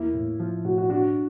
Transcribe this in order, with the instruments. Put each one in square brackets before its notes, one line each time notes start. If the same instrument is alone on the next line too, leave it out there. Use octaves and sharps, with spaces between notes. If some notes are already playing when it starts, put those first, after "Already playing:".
Already playing: [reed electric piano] E2 A#3 [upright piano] E4
[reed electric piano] A2
F3
[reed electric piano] A2 [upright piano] F#4
[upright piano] F#4
[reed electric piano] D4 [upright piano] F#4